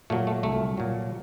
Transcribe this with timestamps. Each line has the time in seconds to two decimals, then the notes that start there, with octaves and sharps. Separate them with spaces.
0.10 A#2 F#3 A3
0.27 A3
0.43 C2 A3
0.77 A#2 F#3